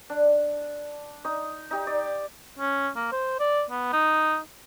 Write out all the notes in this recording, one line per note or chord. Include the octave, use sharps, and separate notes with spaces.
D4
D#4 D#6
D#4 G4
D5
C#4
A#3
C5
D5
B3
D#4